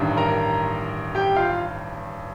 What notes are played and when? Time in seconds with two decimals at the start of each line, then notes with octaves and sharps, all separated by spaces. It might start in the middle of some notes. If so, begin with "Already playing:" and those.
Already playing: A1 G2 D#3
0.17 A#4 A#5
1.15 G4 G5
1.36 F4 F5